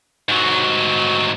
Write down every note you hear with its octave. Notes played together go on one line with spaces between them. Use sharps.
G#2 F#3